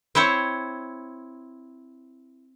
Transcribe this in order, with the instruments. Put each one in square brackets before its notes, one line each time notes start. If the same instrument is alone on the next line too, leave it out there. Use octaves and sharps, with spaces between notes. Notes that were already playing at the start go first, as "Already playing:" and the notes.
[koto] C4 E4 C5 C#5